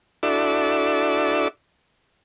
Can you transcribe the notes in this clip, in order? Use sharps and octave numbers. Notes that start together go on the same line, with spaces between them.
D4 E4 F#4 A4 D5 E5